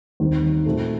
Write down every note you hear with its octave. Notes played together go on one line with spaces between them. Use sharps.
D#2 D#3 G3 C4
A#2 A3 C4 F#4